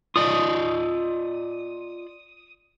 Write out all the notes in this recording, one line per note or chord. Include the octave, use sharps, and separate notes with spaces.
F4 D5 D#5 D#6